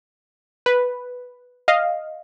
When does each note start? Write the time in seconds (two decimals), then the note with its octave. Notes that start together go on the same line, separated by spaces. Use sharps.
0.66 B4
1.68 D#5 F5